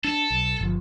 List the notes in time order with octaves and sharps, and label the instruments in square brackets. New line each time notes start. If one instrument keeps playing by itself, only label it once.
[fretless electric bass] D4 [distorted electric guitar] A4
[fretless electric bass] B1
G1 F3